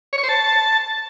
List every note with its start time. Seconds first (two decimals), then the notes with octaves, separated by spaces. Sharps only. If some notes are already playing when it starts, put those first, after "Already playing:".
0.13 C#5
0.18 C#6
0.23 C5
0.29 A5